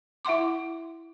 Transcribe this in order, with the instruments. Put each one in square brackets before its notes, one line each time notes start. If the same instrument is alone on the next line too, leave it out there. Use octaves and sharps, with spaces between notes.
[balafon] E4 E5 F#5 C6 D6